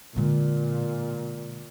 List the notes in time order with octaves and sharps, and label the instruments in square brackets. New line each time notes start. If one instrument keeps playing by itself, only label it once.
[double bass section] A#2 [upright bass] D3 G#3